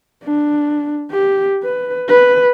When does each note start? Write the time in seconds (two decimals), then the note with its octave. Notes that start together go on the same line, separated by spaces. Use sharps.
0.24 D4
1.11 G4
1.63 B4
2.08 B4